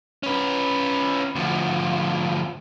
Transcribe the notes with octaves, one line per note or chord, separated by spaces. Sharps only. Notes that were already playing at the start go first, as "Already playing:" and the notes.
C#4 B4
D2 F3